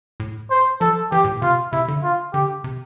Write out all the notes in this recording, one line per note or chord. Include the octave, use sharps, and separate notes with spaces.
A2
C5
F3 A4
E3 G4
A2
A#2
C3 F4
C3 E4
D3
F4
D3 G4
C3